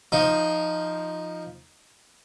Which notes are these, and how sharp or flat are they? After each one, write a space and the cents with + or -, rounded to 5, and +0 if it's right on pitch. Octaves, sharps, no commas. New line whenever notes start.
F3 +0 D#4 +0